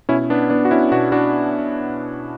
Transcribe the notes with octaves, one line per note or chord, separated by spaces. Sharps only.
B2 C#4 E4
B3 D4
B3 D4
F#4
C#4 E4
B2 D4 F#4
D4 F#4